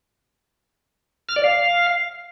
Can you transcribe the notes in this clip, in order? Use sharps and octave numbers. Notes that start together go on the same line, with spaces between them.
F6
D5
F5